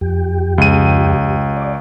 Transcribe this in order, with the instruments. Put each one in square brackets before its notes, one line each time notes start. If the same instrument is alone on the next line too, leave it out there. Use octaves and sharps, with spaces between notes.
[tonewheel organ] F2 G4
[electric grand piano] C#2 D#7
[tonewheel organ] D5